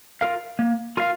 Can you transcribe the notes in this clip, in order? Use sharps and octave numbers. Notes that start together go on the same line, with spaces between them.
F4 A#4 F5
A#3
F4 A#4 F5